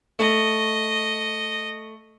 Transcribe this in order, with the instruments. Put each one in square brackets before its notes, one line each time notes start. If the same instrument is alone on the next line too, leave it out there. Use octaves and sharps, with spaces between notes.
[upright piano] A3 [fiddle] D#5